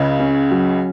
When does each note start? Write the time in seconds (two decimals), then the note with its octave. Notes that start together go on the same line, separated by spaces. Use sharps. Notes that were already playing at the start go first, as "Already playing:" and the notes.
Already playing: C#2 C#3
0.19 C#4
0.51 F#3